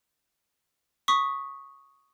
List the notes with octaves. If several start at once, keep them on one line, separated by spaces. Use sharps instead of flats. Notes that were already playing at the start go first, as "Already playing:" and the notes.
C#6 D#6 B6